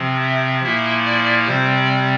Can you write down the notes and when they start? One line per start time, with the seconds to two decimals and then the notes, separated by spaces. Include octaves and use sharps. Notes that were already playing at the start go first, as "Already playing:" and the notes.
Already playing: C3 F3 C4
0.20 E5
0.63 A#2 F3 A#3 E4 E5
1.05 D5
1.47 C3 G3 C4 C5
1.76 D5